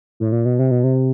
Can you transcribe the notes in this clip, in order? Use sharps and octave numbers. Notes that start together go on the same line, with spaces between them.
A2
A#2
B2
C3
B2
C3